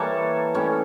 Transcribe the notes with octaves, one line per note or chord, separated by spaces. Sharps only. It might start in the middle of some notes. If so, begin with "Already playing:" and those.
Already playing: E3 G3 A#3 A4 C#5
A2 G3 C#4 E4